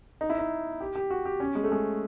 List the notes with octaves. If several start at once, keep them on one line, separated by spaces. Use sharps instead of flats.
D#4
E4
D#4
G4
G4
F#4
G4
C#4
G#3
A3
G#3